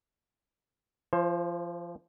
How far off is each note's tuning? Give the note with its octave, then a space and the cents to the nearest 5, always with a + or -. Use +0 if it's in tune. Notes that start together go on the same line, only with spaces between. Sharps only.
F3 -25 C5 +25